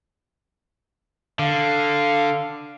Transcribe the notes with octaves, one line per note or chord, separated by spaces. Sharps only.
D3 F5